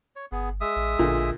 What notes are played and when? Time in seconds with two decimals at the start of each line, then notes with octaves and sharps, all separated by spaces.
0.16 C#5
0.32 G1 B3 G#4
0.61 G#3 E5 D#6
0.76 A1
0.99 A1 A#2 D3